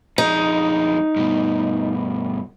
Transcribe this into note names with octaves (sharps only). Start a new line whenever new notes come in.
F2 G#3 D#4
G2 B2